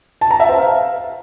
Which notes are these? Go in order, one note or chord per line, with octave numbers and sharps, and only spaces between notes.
A5
A#5
E5
C5
F5